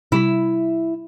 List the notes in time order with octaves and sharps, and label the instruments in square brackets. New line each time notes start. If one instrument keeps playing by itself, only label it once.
[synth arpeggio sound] C3 G3 B5 [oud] E4